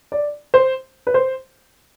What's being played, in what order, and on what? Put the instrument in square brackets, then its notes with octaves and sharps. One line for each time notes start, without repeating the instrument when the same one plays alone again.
[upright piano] D5
C5
B4
C5